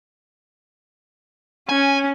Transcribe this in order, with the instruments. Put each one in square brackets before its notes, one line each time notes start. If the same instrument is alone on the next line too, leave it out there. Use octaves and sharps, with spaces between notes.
[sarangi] C#4 [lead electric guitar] G#5